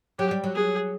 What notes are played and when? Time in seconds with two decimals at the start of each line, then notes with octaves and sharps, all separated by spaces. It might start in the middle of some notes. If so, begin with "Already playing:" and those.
0.19 F#3 G4
0.31 G3
0.44 F#3
0.55 G#4